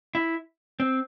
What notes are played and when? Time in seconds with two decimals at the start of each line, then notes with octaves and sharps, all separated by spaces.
0.15 E4
0.80 C4